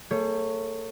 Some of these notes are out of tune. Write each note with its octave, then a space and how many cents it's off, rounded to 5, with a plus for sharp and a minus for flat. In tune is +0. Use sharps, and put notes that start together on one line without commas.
A3 +45 G#4 +35 C#5 +0